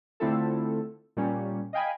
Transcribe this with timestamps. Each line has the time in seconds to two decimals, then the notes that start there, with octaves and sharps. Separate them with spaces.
0.20 D3 A3 C4 E4 F4 A4
1.17 A#2 G3 C#4
1.73 D#5 F5 G5 G#5 B5